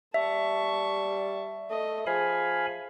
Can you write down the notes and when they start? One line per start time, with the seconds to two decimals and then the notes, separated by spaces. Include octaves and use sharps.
0.14 G3 E5 A5 C#6
1.70 A3 D#5
2.06 F3 G#4 F5 G#5 B5